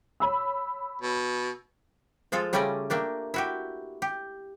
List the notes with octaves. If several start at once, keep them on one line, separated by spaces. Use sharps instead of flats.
C#5 B5 E6
B2
F3 G#3 F4 A4
C#3 G3 A3 C#4 D5 D#5
A3 A#3 D4 G4
E4 F#4 G4
G4